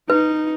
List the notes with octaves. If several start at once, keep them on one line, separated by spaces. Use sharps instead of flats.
D#4 B4